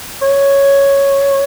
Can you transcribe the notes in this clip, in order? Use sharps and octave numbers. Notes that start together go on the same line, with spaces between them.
C#5